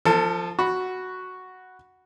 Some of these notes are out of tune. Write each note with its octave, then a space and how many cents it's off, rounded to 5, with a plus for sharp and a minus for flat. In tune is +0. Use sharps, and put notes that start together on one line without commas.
F3 +0 A4 +30
F#4 +0 B5 +0